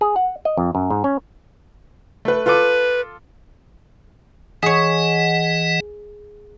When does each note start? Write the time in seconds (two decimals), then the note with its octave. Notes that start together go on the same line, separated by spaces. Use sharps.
0.01 G#4
0.16 F#5
0.45 D#5
0.57 F2
0.75 F#2
0.90 G#2
1.04 C#4
2.25 A3 B4
2.46 F4 A4 B4 D6
4.63 E3 G#4 C#5 D#5 F#5